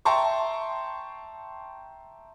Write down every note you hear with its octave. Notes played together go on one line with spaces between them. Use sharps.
E5 G5 A5 A#5 C6 C#6